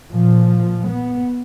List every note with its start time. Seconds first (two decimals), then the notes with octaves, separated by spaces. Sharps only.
0.12 A#2 F3
0.86 B3